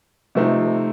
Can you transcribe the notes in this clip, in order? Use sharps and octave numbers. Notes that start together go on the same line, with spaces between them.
C3 F3 A3 C4 D#4